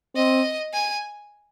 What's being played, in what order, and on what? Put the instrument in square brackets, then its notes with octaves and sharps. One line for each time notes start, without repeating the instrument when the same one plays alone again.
[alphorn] C4 [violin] D#5
[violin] G#5